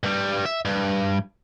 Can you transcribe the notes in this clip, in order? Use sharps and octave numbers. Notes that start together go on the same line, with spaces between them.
G2 G3
E5
G2